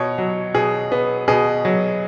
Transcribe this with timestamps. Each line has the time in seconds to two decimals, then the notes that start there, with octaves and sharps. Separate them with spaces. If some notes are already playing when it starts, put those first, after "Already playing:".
Already playing: B2 C#5
0.18 F#3
0.54 B2 G#4
0.92 B3
1.28 B2 G#4
1.65 F#3